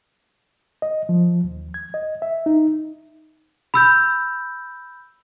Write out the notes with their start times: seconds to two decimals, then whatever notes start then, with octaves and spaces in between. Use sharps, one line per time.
0.82 D#5
1.09 F3
1.44 D#2
1.74 G#6
1.94 D#5
2.22 E5
2.46 D#4
3.74 B5 E6 G6